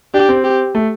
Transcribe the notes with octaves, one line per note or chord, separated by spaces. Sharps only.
D4 G4
C4
G4
A3